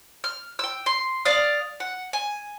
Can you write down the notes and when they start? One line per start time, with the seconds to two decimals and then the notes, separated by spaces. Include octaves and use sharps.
0.24 F6
0.59 G5 E6
0.86 C6
1.25 D5 F5 D#6
1.80 F#5
2.13 G#5